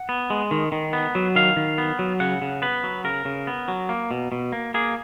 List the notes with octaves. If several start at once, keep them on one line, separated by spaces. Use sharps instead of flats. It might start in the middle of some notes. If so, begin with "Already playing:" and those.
Already playing: F#5
B3
G#3
D#3
D#3
B3
F#3
D#3 F5
D#3
B3
F#3
C#3 F#5
C#3
B3 B4
F#3
C#3 A#4
C#3
B3
F#3
A#3
B2
B2
A#3
A#3 G#4